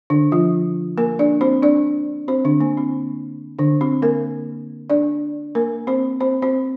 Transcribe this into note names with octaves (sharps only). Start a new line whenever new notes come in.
D3 D4
F3 F4
A#3 A#4
D4 D5
C4 C5
D4 D5
C4 C5
D3 D4
A#3
C4
D3 D4
C4
A#3 A#4
D4 D5
A#3 A#4
C4 C5
C4 C5
C4 C5